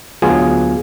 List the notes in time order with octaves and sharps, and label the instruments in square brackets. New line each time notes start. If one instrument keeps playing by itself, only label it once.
[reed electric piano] D2 F#3 B3 F4 G#4 G#5